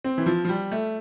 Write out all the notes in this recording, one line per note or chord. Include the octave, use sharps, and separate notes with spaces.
C4
E3
F3
F3
G3
A3